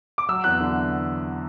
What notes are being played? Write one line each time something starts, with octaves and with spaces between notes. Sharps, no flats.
D6
F#3 E6
E2 F#6
D3